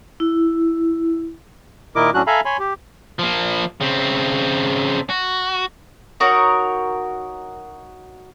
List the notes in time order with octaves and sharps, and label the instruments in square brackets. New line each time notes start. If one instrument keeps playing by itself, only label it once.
[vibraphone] E4
[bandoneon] A#2 D#3 E4 A#4 D#5 D6
A2 F#3 C#4 D4 F#4 F#6
A4 E5 F5 G#5 A#5 B5
C#5 G#5 B5 C6
G4
[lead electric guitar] F3 A#3
C#3 C4
F#4
[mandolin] D#4 F#4 A#4 C#5